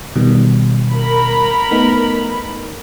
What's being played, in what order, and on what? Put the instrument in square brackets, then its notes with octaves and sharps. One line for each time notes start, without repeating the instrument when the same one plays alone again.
[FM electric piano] B2 D#3 G3
[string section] A#4 B5
[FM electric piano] A3 B3 D#4